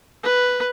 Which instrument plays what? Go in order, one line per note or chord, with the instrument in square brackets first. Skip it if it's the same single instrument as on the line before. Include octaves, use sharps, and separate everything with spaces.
[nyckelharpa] B4